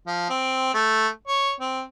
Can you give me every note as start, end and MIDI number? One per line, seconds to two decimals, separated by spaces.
0.07 0.26 53
0.29 0.70 60
0.74 1.07 57
1.27 1.52 73
1.60 1.81 60